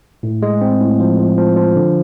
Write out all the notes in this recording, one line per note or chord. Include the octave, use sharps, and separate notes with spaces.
A2
G#3
C4
A2
F3
F3
F3
F3
D3